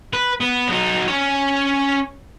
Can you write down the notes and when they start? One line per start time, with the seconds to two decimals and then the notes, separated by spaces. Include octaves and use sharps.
0.13 B4
0.40 B3
0.68 F#3 D#4
1.08 C#4 C#5